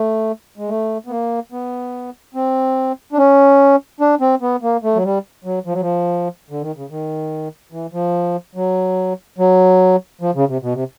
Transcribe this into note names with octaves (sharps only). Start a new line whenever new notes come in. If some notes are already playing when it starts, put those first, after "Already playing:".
Already playing: A3
G#3
A3
B3
A#3
B3
C4
D4
C#4
D4
C4
B3
A#3
A3
F#3
G3
F#3
F3
F#3
F3
D3
D#3
C#3
D#3
E3
F3
F#3
F#3
F3
C#3
C3
B2
C3